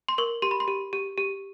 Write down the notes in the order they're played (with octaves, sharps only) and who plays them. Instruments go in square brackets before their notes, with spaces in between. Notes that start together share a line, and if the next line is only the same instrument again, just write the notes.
[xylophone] C6
A#4 C#6
G4 C6
B5
C6
G4
G4
G4